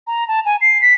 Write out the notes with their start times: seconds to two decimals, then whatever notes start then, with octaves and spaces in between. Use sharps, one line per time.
0.07 A#5
0.28 A5
0.45 G#5
0.61 C7
0.82 B6